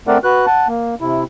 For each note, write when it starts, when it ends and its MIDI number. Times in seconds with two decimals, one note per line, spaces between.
0.07 0.18 57
0.07 0.18 60
0.07 0.18 70
0.07 0.18 74
0.07 0.18 78
0.24 0.46 66
0.24 0.46 71
0.24 0.46 90
0.47 0.67 78
0.47 0.67 81
0.68 0.95 58
1.01 1.24 48
1.01 1.24 64